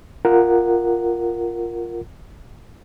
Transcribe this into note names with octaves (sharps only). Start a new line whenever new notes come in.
F4 A#4 F#5